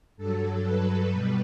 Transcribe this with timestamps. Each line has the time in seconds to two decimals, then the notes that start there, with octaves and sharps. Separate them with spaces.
0.17 G2 F#3 A4
0.63 B4
1.09 B2 G3